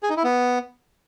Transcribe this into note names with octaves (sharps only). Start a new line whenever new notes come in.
G#4
D#4
E4
B3